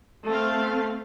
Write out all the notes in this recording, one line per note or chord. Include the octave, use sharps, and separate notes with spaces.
A3 C4 F5